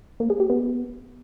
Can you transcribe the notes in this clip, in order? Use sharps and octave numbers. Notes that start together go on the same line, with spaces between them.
A#3
G#4
G4
B3